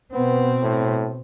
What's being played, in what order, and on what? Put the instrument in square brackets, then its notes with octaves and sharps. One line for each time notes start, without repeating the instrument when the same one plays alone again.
[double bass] B2 C4 [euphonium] B3
[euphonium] A2